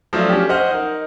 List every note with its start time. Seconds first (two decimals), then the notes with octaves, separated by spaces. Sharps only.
0.13 F3 F#3 A3 D4 F4
0.29 C#4 G4
0.49 C5 D#5 F#5 F6
0.71 D#4 A#4